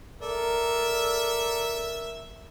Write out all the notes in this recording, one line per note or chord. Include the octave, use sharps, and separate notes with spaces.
A4 A#4 D5 E5